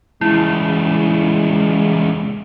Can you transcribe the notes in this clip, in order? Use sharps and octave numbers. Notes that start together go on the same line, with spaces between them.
E2 C#3 G#3 E4